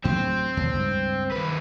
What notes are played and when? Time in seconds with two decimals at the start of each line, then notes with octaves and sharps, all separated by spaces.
0.05 D2 A2 F#3 C4
0.57 D#2 B2
0.73 C#2 G2
1.32 D#2 B4